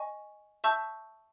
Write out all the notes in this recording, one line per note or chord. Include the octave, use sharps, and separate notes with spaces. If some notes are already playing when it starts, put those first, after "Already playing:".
Already playing: D#5 G#5 C#6
E5 A5 C#6 E6 G6